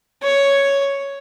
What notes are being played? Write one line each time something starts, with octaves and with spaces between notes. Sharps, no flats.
C#5